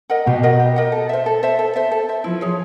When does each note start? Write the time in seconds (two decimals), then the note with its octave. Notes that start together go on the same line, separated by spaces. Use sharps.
0.10 A#4 D#5 F#5
0.26 B2 G4
0.43 A#4 D#5 F#5
0.60 G4
0.76 A#4 D#5 F#5
0.92 A4
1.09 C5 E5
1.26 A4
1.43 C5 E5
1.59 A4
1.76 C5 E5
1.91 A4
2.09 C5 E5
2.24 F3 E4
2.41 G#4 C#5